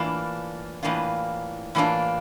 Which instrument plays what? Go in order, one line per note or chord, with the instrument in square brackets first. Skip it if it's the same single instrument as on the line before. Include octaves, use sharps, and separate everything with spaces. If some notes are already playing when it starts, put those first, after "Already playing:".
Already playing: [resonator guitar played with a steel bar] A2 E3 A#3 D4 F4
A2 E3 A#3 D4 F4
A2 E3 A#3 D4 F4